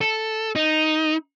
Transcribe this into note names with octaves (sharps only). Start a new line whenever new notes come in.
A4
D#4